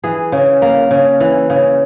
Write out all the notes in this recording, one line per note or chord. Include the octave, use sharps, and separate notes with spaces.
E3 G#4
C#3
A#3
C#3
E3
C#3